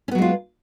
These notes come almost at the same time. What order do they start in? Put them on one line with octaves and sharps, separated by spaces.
C#4 B3 F#3 G#3 F4